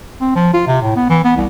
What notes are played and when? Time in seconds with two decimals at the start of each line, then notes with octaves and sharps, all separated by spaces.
0.21 C4
0.35 F3
0.53 F4
0.67 C3
0.82 A2
0.96 B3
1.09 E3
1.24 B3
1.36 C2